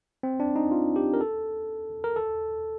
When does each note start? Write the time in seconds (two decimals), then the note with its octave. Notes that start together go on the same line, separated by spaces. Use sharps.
0.23 C4
0.40 D4
0.56 D#4
0.71 F4
0.96 G4
1.14 A#4
1.21 A4
2.04 A#4
2.16 A4